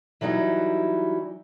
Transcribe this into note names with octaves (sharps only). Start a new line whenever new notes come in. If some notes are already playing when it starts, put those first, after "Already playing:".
E3 F#3 G3 D#4 E4